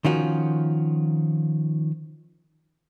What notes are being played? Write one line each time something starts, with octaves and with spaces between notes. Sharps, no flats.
D#3 F3 C#4 F4 F#4